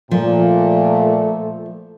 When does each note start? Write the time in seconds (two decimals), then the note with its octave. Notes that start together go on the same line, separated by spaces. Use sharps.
0.11 A#2 F3 A3